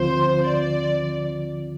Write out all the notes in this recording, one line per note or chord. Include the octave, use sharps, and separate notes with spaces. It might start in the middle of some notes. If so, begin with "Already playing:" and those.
Already playing: D2 D3 F3 C4 F4 C5
D5